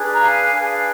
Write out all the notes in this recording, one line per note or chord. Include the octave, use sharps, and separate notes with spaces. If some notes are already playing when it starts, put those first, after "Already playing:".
Already playing: D4 G#4 B4
A#5
F5 G#5
D4 G#4 B4
F5